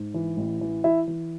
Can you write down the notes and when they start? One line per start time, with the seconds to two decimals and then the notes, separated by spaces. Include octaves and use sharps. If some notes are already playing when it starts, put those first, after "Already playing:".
Already playing: G#2
0.14 E3
0.37 A1
0.61 E3
0.84 E3 E4 E5
1.08 E3